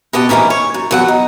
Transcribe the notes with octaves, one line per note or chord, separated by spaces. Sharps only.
B2 G4 D#5 F#5 A5
G#2 D#3 E3 A#3 C#4
C#5
F#2
E2 F#3 F#5
D#4